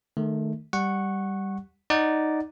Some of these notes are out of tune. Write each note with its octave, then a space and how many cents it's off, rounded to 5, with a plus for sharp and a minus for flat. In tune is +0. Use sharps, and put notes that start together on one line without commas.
D#3 -25 A3 -10
G3 +0 F#5 +0 C#6 -15
D#4 +0 D5 +0 F#5 +0